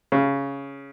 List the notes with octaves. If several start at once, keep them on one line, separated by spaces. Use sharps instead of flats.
C#3